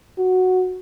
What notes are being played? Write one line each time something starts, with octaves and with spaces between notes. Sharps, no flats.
F#4